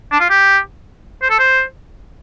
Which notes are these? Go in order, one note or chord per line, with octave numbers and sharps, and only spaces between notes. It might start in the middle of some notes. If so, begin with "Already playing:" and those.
D4
F4
G4
C5
A4
C5